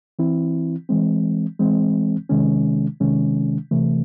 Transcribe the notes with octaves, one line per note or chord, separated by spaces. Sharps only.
E3 C4 E4
E3 G#3 C4
E3 G#3 C4
C3 D#3 G#3 C#4
C3 D#3 G#3 C#4
C3 E3 A3